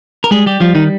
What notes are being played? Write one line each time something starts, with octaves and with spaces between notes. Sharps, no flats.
A#4
G3 G#3 G#4
G3 G4
F3 G3 F4
D#3 D#4